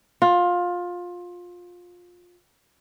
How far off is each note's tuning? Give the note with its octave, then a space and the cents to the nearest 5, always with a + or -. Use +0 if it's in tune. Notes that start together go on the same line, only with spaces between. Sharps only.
F4 +20